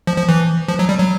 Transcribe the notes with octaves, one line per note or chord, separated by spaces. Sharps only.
F3
F3
E3
F3
F#3
G3
F#3